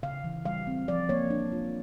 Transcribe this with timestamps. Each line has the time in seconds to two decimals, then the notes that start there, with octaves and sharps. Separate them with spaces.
0.03 C#3 F5
0.24 E3
0.45 G3 F5
0.67 C4
0.88 F3 D5
1.09 A#3 C#5
1.30 D4
1.52 F4